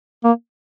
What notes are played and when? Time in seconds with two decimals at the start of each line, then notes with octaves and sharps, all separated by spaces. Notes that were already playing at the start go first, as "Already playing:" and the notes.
0.24 A#3